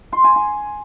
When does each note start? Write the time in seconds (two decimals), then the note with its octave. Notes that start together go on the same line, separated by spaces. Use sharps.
0.12 C6
0.24 G#5
0.36 G#5